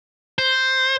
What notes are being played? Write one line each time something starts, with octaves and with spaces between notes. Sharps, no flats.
C5